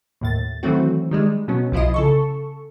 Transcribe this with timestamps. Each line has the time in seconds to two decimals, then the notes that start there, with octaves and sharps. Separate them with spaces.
0.21 D#2 A2 A6
0.63 D#3 E3 F#3 A3 C4 F#4
1.11 D#3 G3 G#3
1.48 B2 F#3 B3 C#4
1.72 B1 F3 E4 F4 D#5
1.94 C#3 A4 C#6